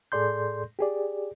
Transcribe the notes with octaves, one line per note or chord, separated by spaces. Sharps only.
A2 G#4 A4 D5 C6 G6
G4 G#4 D5